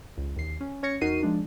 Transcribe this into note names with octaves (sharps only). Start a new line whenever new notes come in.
C#2
D#2 C7
C#4
C#4 C#5 G#6 A#6 C#7
E2 D#4 F#4 A#4 C7 D#7
F3 G#3 D4